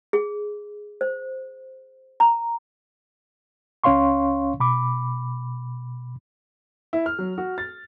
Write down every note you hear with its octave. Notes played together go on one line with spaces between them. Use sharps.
G#4
C5
A#5
C#2 C#4 C#5 F5 C6 C#6
B2 B5 D6
E4
F6
F#3
F#4
A6